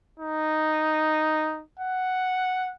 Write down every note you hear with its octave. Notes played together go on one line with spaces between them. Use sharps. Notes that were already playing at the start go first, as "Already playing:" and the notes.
D#4
F#5